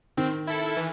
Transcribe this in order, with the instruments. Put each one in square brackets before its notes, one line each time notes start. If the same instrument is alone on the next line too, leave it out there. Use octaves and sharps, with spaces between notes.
[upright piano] D#3 [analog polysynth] C4
[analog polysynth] E4 A4
E3